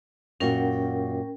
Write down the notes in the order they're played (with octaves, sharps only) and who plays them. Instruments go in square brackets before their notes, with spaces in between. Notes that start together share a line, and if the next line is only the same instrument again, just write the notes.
[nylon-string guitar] F#2 A#2 F#4 [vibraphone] C#4 A#4 G5